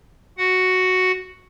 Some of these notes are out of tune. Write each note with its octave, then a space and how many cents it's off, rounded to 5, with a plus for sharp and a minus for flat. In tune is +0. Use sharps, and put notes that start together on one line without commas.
F#4 +0 F#5 +0